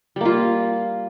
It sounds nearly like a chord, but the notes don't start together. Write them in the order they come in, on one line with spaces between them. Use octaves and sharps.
G3 A#3 F4